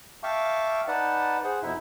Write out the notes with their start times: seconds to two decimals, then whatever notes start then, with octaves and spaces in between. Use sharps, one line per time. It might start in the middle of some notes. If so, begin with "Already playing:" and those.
0.23 E5 F5 G5 A5 C#6 D6
0.88 D#4 B4 D5 F#5 A5
1.44 G#4 C5 F#5
1.63 F2 B2 D#4 E4 E5